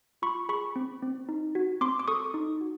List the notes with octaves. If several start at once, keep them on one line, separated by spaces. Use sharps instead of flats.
F4 B5 C#6
G#4 B5 C#6
C4
C4
D#4
F#4
C4 C6 D6
D6
A4 C#6 D#6
D#4
F#4